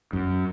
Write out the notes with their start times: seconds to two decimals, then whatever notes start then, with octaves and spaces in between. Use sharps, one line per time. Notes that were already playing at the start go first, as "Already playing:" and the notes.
0.13 F#2